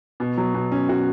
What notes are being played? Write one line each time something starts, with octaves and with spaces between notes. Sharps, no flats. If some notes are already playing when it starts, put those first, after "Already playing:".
B2
F#3
B2
C#4
F#4